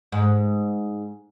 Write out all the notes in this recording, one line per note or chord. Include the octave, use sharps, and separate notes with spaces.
G#2